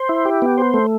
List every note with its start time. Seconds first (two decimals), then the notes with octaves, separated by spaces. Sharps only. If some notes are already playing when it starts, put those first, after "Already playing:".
Already playing: C5
0.09 E4
0.25 G4
0.42 B3
0.58 C5
0.74 A3